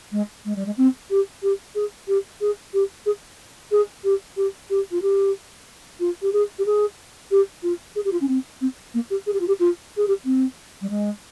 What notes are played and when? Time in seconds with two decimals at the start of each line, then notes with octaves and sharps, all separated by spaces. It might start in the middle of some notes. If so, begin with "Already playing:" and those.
0.12 G#3
0.45 G#3
0.56 G3
0.66 G#3
0.77 C4
1.10 G4
1.43 G4
1.75 G#4
2.08 G4
2.41 G#4
2.74 G4
3.06 G#4
3.71 G#4
4.04 G4
4.37 G4
4.70 G4
4.91 F4
5.02 G4
6.00 F4
6.22 G4
6.33 G#4
6.59 G4
6.66 G#4
7.31 G4
7.63 F4
7.96 G#4
8.05 G4
8.12 F4
8.21 C#4
8.28 C4
8.61 C4
8.94 A#3
9.10 G4
9.27 G#4
9.33 G4
9.40 F4
9.48 G4
9.60 F4
9.97 G#4
10.08 G4
10.25 C4
10.82 G3
10.90 G#3